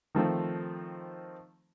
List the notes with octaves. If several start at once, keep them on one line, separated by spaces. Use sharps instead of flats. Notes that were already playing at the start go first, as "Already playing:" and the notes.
D#3 F3 A3 C4